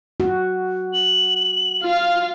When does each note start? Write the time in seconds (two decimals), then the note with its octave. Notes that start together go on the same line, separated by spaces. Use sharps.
0.20 F#4
0.93 F#7
1.82 F4 F5 F6